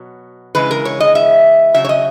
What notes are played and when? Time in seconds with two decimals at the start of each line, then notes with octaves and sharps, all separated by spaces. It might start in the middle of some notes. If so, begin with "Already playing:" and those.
Already playing: B2 F#3
0.55 C#3 E3 G#3 B4
0.71 A#4
0.85 C#5
1.00 D#5
1.15 E5
1.74 C#3 F#3 E5
1.85 C#5
1.89 D#5